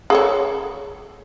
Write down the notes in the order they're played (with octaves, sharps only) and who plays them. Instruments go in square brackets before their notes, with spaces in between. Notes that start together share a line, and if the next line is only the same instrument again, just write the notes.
[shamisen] G#4 A4 C#5